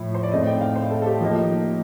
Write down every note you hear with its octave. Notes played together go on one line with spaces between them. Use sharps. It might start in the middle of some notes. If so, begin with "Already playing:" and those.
Already playing: A2 F3
C5
D5
A2 A3 C4 D#4 D#5
G5
F5
C5
A4
A4
G4
F3 A#3 D#4